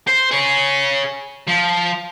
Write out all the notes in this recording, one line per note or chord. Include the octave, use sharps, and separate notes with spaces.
C5
G#4 C#5
F3